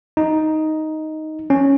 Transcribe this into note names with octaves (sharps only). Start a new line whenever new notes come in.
D#4
C#4